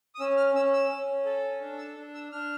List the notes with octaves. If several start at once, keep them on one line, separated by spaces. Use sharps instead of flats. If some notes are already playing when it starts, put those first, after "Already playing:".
D#6
C#4 E6
F6
C#4 E6
E6
C#4
A4
D4
E6
D4
E6
D4 F6